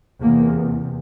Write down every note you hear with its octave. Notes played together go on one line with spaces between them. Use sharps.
E2 C3 A#3